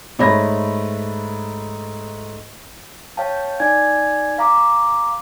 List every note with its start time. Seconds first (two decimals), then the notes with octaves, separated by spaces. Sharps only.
0.19 G#2 A3 C#5 B5 A#6
3.17 C#5 F5 G5 A5
3.60 D#4 D5 G#5 G#6
4.38 F5 A#5 D6